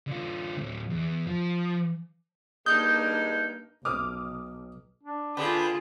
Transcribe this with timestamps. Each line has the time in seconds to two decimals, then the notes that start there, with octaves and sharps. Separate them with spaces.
0.07 D3 F4
0.57 D2 A2
0.90 E2
1.27 F3
2.66 G2 G#3 A#3 D4 D#4 A#4 D#6 G6
3.85 B1 D6 D#6 F6
5.03 D4
5.37 D3 F4 G#4 B4 G5